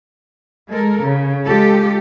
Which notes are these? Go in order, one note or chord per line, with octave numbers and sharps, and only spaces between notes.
G#3 A4 A#4
C#3
G#3 F4 G4 A4